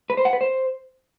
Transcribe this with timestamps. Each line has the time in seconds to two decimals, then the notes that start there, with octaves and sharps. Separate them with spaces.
0.10 B4
0.17 C5
0.25 F#5
0.33 B4
0.41 C5